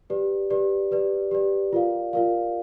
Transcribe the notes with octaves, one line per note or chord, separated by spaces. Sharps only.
G4 B4 D5
G4 B4 D5
G4 B4 D5
G4 B4 D5
F4 A#4 D5 F5
F4 A#4 D5 F5